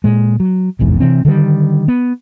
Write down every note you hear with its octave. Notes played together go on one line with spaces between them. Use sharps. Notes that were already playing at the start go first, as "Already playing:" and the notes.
A#2 G#3
F#3
F1 A#1 E2 G#2
C3 E3 C4
D3 D#3 G3
B3